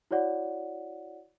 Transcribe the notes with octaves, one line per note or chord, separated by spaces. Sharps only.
E4 F#4 C#5 D5 F#5